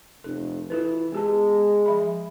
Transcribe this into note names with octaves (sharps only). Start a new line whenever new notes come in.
F1 A4
E3 F4 A4 B4
G#3 B3 G4 A5
F3 E5 B5